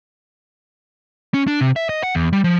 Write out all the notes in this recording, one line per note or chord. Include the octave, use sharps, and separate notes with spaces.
C#4
D4
C3
E5
D#5
F#5
E2
G3
F3